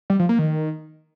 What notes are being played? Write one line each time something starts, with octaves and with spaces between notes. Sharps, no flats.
G3
F3
A#3
D#3